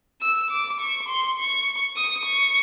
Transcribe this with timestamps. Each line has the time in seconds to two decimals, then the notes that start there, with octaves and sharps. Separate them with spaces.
0.21 E6
0.51 D6
0.80 C#6
1.09 C6
1.38 C#6
1.96 D#6
2.25 C#6